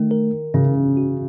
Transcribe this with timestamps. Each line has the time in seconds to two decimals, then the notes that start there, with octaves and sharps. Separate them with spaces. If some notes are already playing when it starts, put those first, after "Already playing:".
Already playing: D#3 A3
0.11 A#4
0.54 C#3 C#4
0.97 F#4